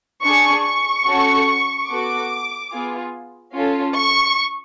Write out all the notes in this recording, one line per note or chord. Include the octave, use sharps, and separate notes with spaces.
D4 G#4 C#6
C#6
C#4 F#4 A4
B3 F#4 A4 D6
B3 F4 G#4
C#4 F4 A4
C#6